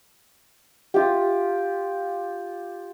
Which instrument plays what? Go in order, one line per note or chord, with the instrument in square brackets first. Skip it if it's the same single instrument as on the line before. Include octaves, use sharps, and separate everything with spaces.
[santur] F4 G4